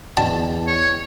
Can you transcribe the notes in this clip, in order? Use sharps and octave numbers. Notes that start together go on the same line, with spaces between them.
E2 D5 D#5 G5 A5
C#5